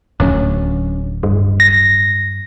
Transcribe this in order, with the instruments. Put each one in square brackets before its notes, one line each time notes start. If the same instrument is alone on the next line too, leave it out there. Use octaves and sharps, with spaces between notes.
[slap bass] D1 D2 F#3 [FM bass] C#4
[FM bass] G2
[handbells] A#6